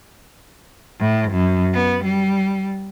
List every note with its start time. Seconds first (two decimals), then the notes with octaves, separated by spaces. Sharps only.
1.00 A2
1.32 F#2
1.74 B3
2.04 G3